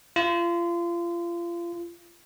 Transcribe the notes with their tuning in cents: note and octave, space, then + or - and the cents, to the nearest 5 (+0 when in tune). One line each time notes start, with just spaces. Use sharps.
F4 -30